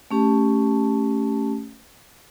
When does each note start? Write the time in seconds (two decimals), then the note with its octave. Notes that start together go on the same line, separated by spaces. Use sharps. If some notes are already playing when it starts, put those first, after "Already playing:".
0.11 A3 C#4 G4 A5